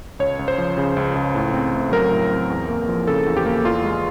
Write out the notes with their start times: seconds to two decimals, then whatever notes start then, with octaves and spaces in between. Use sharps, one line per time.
0.19 C#2 C#5
0.39 C#2
0.48 C5
0.58 F3
0.77 C#3
0.97 C#2
1.15 C#2
1.35 A2
1.53 C4
1.74 A3
1.92 F#3 A#4
2.11 A2
2.30 C4
2.50 E2
2.69 A#3
2.89 F3
3.07 C#3 A4
3.26 E2
3.37 G4
3.46 A#3
3.64 E2 F4
3.84 G#3